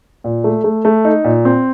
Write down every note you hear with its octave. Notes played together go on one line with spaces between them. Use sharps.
A#2
A3
A3
A3
D#4
A#2
C4